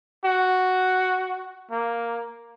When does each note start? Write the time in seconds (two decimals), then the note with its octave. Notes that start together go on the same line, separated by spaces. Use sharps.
0.25 F#4
1.71 A#3